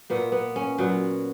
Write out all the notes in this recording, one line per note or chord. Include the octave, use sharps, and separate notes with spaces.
A#2 A#3 B3
B3
C#4
A#2 F#3 B3